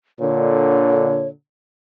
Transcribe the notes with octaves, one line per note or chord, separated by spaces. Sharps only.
A#2 D3 C#5